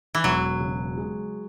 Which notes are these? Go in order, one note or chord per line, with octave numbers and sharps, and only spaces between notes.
E3
E1 F#3
C#3
G#3